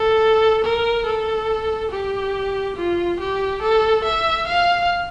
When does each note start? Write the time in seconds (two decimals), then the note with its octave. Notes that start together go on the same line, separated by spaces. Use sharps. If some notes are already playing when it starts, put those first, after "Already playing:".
Already playing: A4
0.65 A#4
1.06 A4
1.92 G4
2.76 F4
3.20 G4
3.62 A4
4.04 E5
4.47 F5